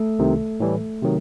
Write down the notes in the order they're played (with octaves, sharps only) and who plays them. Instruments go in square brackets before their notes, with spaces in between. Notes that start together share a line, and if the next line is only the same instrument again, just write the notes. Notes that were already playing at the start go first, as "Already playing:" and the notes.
Already playing: [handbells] A3 A4
[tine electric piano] C2 C3 D#3
A2 E3 G3
C3 D#3 F#3